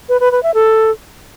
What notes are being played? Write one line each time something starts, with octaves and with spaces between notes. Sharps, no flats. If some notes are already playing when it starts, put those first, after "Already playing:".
B4
B4
B4
E5
A4